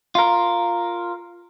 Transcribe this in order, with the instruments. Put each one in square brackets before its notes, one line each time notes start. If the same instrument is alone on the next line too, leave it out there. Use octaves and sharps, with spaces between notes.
[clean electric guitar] F4 A#4